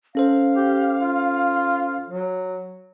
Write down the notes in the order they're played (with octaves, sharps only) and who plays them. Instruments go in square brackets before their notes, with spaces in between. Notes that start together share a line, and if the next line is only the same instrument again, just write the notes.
[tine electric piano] C#4 A4 C5 [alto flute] F5
[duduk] G4
F4
F#3